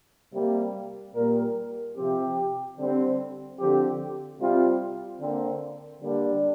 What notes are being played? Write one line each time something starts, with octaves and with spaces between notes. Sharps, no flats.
C3 G3 A#3
A#2 G3 A#3 A#4
C3 F3 C4 G4
D3 G3 C4
D3 F3 C4 G4
C3 G3 C4 F4
D3 A#3 C4
D3 G3 A#3 D4